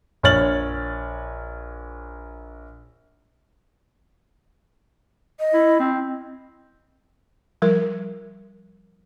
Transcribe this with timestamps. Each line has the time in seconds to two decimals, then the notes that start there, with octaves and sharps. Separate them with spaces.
0.23 A#1 C#5 F6 A6 F#7
5.39 D#5
5.54 E4
5.79 C4
7.62 F3 G3 A#4